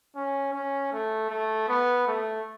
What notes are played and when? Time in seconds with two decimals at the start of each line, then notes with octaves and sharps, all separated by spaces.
0.16 C#4
0.54 C#4
0.92 A3
1.30 A3
1.68 B3
2.07 A3